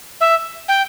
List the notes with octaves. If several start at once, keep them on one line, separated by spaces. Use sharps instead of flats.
E5
G5